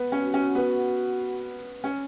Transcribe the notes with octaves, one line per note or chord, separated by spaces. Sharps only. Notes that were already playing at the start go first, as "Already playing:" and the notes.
Already playing: B3
C#4
F#4
C#4
B3
C#4